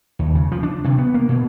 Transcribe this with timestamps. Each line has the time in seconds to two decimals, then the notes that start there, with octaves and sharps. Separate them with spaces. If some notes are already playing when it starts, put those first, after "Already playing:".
0.19 D#2
0.35 C#3
0.52 F3
0.63 D4
0.84 C3
0.98 B3
1.14 A#3
1.29 B2